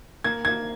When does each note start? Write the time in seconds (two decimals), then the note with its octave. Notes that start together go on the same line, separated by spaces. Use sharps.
0.24 A#3 G#6
0.45 A#3 G#6